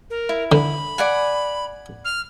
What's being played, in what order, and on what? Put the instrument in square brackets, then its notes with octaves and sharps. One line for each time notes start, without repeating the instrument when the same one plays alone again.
[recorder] A#4
[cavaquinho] E4
[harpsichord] D3 [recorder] B5
[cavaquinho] D5 F#5 G#5
[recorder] F6